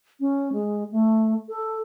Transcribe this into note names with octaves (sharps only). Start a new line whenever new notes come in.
C#4
G#3
A3
A4